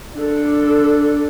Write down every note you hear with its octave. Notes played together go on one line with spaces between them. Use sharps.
D4 A4